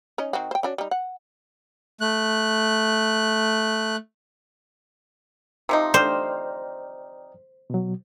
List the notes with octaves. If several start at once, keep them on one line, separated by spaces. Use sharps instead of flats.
C#4 D#4 D#5
D#3 C4 F#4
C5 G5
C#4 D4 F#4
G3 D#4
F#5
A3 F#6
C3 F3 D#4
C5 D5 G5 F6
B2 F#3